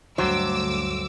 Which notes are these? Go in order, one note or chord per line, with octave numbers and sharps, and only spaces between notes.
D2 G2 F#3 C5 D6 E6